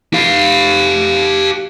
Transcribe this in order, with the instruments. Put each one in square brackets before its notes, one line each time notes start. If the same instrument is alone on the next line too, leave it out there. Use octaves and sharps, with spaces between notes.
[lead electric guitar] G4 F5